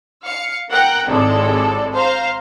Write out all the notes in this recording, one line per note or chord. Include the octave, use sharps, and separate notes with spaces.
F5 C#7
A#4 F#5 G5 A#5 F#6
G#1 A2 C3 G#3 A4 D5
C5 F5 A#5